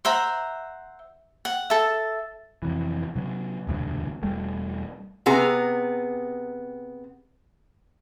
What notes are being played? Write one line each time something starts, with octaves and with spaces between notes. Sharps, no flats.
C5 E5 F#5 A#5
F#5
A4 E5
F2 C3 E3
C3 F#3
E1 D2 G2 C3
E1 G3 A3
C3 B3 G#4 A#5